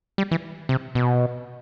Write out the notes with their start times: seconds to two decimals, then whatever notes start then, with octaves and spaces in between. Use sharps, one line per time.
0.18 G3
0.31 E3
0.69 C3
0.95 B2